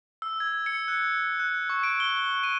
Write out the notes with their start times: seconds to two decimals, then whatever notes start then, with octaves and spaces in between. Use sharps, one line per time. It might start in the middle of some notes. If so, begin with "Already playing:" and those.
0.22 E6
0.40 G#6
0.66 C#7
0.88 F#6
1.40 F#6
1.70 C#6
1.83 D7
2.00 G7
2.43 D#7